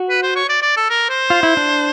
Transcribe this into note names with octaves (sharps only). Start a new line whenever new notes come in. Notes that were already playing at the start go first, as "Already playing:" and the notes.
Already playing: F#4
B4
C5
C#5
D5
D5
A4
A#4
C5
F4
E4
D4